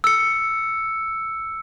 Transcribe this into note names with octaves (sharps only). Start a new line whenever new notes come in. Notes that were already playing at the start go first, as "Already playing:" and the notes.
E6 C#7